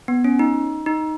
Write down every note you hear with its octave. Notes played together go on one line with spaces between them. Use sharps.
B3
C#4
D#4
D#4